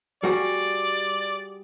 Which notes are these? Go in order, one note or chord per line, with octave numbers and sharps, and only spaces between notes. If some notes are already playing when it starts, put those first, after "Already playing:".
G3 F#4 G#4 D5